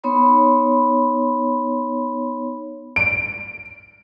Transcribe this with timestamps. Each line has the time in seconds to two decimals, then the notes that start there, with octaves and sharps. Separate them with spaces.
0.04 B3 D#4 C#5 B5 C6
2.96 D7